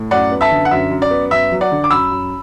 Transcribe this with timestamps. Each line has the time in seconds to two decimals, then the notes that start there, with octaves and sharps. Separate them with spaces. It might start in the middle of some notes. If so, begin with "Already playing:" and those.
Already playing: A2
0.11 F#2 D5 F#5
0.31 B3
0.41 E5 A5
0.51 D3
0.65 F#5
0.71 F#2 E5
0.91 F#2
1.02 D5
1.11 B3
1.31 F#2 E5
1.51 F#3
1.61 D5 F#5
1.71 D3
1.84 D6
1.90 F#2 B5 E6
2.11 F#2